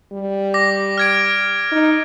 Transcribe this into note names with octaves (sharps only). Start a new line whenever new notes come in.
G3
D6 A#6
F6 G#6 D7
D#4